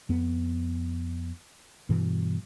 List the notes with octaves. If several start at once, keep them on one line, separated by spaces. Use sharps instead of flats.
F2 B3
G2 B2 E3